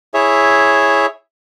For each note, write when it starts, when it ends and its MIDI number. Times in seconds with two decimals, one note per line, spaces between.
0.14 1.06 64
0.14 1.06 68
0.14 1.06 73
0.14 1.06 76